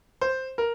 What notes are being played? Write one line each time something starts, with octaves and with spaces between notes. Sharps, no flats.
C5
A#4